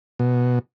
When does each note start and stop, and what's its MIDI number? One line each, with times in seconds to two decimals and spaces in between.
0.19 0.59 47